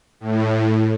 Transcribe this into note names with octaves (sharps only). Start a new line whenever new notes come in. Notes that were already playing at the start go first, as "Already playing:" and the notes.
A2